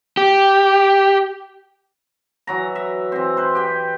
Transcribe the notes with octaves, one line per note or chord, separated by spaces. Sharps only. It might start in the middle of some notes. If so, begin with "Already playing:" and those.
G4
E3 F#3 A#5
E5
E3 C4
B4 C5
G4 G5